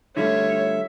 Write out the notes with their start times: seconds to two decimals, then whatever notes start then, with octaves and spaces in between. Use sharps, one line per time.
0.17 D3 G3 A3 F4 C#5 E5